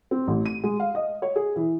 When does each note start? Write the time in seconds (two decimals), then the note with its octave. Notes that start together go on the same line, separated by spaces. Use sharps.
0.11 C4
0.28 A1
0.46 D#7
0.64 G#3
0.80 F5
0.95 D#5
1.22 C#5
1.36 G#4
1.56 E3